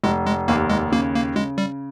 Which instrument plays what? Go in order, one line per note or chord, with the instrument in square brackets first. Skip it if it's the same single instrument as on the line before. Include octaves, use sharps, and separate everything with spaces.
[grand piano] F1 [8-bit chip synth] G#3
[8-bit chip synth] G#3
[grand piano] D#2 [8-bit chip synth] A#3
[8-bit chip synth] G#3
[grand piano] C#3 [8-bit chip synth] A#3
[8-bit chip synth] A#3
[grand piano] C#3 [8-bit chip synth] G#3
[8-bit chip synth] G3